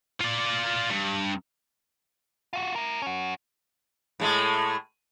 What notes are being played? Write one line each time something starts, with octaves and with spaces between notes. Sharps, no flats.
F4 D5
G2
F4 F#4
E4 A#4
C#4 F#4
A2 G#3 A3